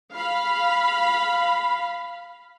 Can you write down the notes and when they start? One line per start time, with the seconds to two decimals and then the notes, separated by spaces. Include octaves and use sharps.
0.13 F5 B5